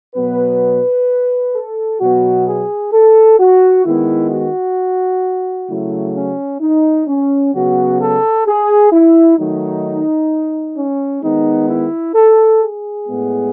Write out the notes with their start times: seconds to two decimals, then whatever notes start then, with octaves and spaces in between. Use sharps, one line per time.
0.16 B2 F#3 B3 B4
1.55 A4
2.00 B2 F#3 B3 F#4
2.47 G#4
2.93 A4
3.40 F#4
3.85 D#3 G#3 B3 E4
4.31 F#4
5.69 C#3 F#3 A3 E4
6.16 C#4
6.61 D#4
7.07 C#4
7.54 C#3 F#3 B3 F#4
8.00 A4
8.47 G#4
8.92 E4
9.38 D#3 F#3 A3 D#4
10.77 C#4
11.23 D#3 G#3 B3 D#4
11.69 E4
12.15 A4
12.61 G#4
13.08 A2 G#3 B3